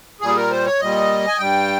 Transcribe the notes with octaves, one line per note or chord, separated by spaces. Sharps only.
A#2 G3 G#4
A#4
C5
C#5
A#2 G3 D#5
G#5
G2 G3 G5